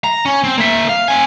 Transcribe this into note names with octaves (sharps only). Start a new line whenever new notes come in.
A#5
C#4
C4
A#3 E5
F5
C4 G#5